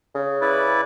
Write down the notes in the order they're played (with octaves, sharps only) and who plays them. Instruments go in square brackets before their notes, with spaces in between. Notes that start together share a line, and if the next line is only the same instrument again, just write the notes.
[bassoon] C#3
[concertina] E4 B4 D5